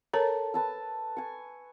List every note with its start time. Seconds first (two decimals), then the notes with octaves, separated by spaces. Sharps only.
0.13 A4 A#4 C#5 A#5
0.54 B4 A5 E6
1.17 G#5 C#6